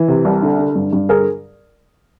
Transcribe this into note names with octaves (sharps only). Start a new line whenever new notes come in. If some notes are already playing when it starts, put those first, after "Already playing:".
Already playing: E3
C3
C2
D3
D3
G2
G2
D3 G#4 A#4